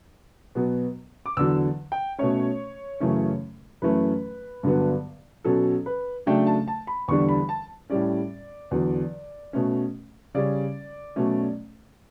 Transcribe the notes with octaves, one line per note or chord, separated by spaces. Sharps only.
B2 F#3 B3
D6
E2 D3 F#3 E6
G5
B2 A3 C#4 C#5
F#2 C#3 E3 A3 C#4
F#2 E3 A3 C#4 B4
G2 D3 F#3 B3
B2 F#3 C#4 A4
B4
C#3 F#3 A3 D4 G5
A5
A5
B5
E2 D3 G3 D4 C#6
B5
A5
A2 G3 C#4 D5
E2 D3 F#3
B2 A3 C#4
C#3 G3 C#4 D5
B2 F#3 A3 C#4